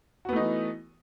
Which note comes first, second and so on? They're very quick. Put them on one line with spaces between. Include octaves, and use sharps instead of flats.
F#4 B3 A3 D#4 E3